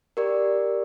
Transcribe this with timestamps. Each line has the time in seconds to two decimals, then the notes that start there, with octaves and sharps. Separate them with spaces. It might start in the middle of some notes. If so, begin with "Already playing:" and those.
0.17 G4 A#4 D5